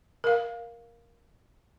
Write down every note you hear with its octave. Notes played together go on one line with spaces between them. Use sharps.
A#4 F5